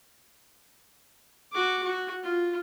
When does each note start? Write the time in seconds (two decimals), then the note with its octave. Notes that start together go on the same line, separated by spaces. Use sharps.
1.53 F#4 D6
1.83 F#4
2.23 F4